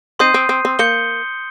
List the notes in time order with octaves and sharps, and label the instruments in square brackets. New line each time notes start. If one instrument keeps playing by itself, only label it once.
[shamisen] C4 D#4 [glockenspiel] C6 D#6 G6 C7 D#7
[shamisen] C4
C4
C4
[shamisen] A#3 [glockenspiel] G6 C#7 G7